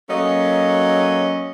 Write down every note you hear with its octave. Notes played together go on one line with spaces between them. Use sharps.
F#3 A#3 C#4 A4 D#5